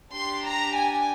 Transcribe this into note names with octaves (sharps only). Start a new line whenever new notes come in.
D4 G4 C6
A#5
G#5